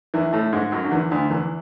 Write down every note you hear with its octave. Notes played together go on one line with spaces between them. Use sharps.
E2 E3
A2 A3
G#2 G#3
F#2 F#3
D3
E2 E3
D2 D3
E2 E3